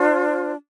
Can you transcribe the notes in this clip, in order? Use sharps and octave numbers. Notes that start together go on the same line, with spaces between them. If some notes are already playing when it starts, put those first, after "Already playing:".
Already playing: D4 F4 C5